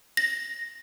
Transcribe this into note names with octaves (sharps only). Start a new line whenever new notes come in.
A#6